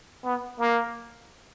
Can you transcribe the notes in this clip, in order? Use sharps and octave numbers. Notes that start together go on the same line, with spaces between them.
B3
A#3